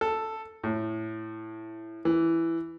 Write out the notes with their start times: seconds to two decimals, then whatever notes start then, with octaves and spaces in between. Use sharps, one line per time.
0.01 A4
0.64 A2
2.05 E3